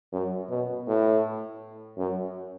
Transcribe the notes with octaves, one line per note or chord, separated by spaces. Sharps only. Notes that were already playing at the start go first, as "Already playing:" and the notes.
F#2
B2
A2
F#2